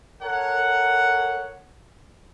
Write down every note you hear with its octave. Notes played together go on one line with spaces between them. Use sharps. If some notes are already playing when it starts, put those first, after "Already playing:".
A4 A#4 C#5 F#5